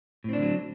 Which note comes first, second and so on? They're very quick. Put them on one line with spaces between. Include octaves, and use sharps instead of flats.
A2 C4 D4 D3 F#3